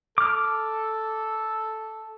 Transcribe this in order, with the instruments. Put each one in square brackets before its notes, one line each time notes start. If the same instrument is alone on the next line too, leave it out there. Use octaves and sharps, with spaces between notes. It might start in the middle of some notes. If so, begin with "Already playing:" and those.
[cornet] A4 [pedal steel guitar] D6 F6